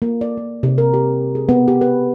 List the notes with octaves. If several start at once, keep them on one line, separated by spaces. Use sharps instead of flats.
A#3
D5
A#3
C3
A#4
G4
G#4
B3
G4
B4